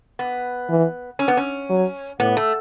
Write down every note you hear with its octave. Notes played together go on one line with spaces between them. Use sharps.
B3
E3
C#4
B3
C#4
F#3
A2 B3
A3